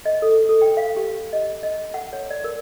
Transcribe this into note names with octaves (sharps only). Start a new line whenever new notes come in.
D#5
A4
A4
G5
F5
G4
D#5
D#5
F#5
C#5
D5
A#4